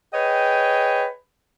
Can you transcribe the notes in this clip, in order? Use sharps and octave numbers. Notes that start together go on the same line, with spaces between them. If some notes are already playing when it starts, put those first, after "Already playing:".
G#4 B4 C#5 D#5 G5